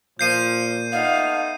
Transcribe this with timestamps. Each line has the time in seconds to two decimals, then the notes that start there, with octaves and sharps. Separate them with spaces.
0.19 A#2 F3 G6 C7 D#7
0.92 A3 B3 D#4 F5